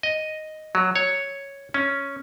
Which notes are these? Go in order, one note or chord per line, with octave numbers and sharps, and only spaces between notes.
D#5
F#3
C#5
C#4